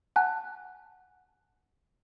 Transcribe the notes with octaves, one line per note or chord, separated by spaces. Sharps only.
F#5 G#5 A5 F#6